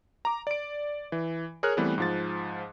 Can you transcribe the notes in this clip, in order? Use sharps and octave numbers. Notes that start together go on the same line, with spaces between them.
A#5 D6
D5 D7
E3
G#4 A#4 C#5 F6 F#6
E3 G3 A3 B3 C4
G#2 F3 A6